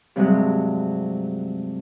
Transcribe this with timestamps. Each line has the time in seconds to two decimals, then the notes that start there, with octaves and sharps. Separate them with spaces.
0.16 G2 C3 F#3 G#3 G4